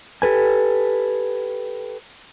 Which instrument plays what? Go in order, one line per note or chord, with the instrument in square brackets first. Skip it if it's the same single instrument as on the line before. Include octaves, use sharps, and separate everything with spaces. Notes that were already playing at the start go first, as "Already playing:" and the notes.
[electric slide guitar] G4 A4 B4 G#5